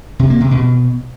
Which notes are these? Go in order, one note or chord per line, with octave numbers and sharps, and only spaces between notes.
C3
A#3
C3
B2